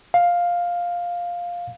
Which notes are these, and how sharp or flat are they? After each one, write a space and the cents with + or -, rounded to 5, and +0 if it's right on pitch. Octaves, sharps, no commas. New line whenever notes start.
F5 +5